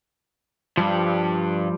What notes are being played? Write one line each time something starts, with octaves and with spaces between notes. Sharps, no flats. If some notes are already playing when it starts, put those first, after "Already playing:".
G2 F3 G3